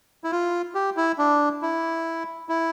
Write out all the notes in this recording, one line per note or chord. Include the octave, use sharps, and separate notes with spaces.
E4
F4
G4
E4
D4
E4
E4